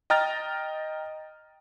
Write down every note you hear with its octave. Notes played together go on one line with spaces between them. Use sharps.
D#5 G5 A#5 F6 A6